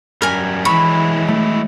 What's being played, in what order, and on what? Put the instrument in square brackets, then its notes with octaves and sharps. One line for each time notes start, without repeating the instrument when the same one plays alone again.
[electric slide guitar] F#2 G3 [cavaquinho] A#4 G#5
[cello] E3 [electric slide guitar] F#3 G#3 E4 [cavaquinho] B5 [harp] C#6 B6
[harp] A3